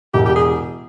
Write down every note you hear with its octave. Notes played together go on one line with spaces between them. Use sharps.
E1 G4
G4
G#4